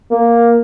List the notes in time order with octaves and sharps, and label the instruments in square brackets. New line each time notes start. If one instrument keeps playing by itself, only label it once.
[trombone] A#3